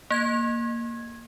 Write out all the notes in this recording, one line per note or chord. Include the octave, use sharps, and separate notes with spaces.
A#3 G#6